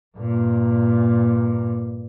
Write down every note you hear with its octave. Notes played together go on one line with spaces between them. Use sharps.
G2 A#2